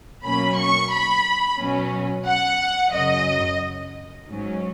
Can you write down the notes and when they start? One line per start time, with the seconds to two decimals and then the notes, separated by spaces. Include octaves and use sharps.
0.24 B2 F#3 A#3 C#4 B5
0.58 C#6
0.91 B5
1.59 B2 F#3 C#4
2.26 F#5
2.93 F#2 C#3 F#3 D#5
4.27 G#2 F#3 C#4